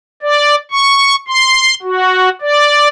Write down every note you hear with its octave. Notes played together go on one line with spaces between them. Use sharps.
D5
C#6
C6
F#4
D5